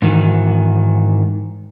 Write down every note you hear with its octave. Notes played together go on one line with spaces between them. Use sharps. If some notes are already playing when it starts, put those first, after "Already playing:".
G#2 D#3 E3 F#4